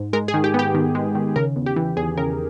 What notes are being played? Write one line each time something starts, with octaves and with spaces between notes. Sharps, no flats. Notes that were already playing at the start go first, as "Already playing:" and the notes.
Already playing: G#2
G#3 A#4
G#4
D#3
G4
B3 G4
D#3
G#3
D#3
C#3 A#4
E2
G4
E3
E2 G#4
C#3 A#4